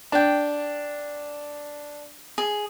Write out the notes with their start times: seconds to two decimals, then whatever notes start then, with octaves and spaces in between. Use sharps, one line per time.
0.12 D4 D5 G5
2.38 G#4